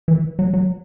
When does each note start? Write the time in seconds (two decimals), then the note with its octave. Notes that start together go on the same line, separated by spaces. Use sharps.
0.08 E3
0.39 F#3
0.53 F#3